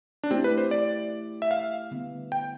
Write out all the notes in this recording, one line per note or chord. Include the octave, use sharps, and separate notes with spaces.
D4
A3 C4 E4 G4
B4
C5
D5
E5
F5
D3 G3 B3
G5